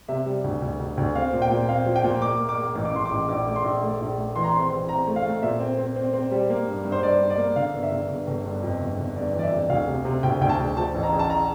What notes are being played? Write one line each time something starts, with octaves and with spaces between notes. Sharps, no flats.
C3 E5
G3
D2
D2
D2
D2
C4 F5
A#2
G5
A#2
C4 F5
F3
G5
A#2
A#3 D6
A#3
D6
A#3
A1
D6
A1 C6
D6
A1
A#1 D6
A3 D6
C6
A#1
A3
A#1
A3
E3 C6
A#5
C4 C6
C6
E3
C4 A#5
A3
F5
A3
A#2 E5
C4
C4
C4
C4
G3
A#3
G2
G2
C5
G2 D5
G2
D5
A#3
D3 F5
G1
E5
D3
G1
G1
G2
F2
G1
G1
G1 D5
E3
D5
E5
F2
D2 F5
C3
C3
D2 G5
D2 G5
A5
D2
F3 A5
A1
A#5
A1
A5
A#5